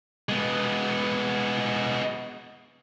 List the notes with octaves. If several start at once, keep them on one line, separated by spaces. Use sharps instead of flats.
G#3 B3